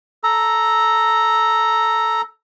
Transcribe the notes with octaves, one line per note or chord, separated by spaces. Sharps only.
A4 A#5